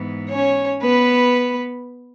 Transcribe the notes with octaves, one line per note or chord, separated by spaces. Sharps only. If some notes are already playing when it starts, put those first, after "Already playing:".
Already playing: G#2 E3 B3
C#4 C#5
B3 B4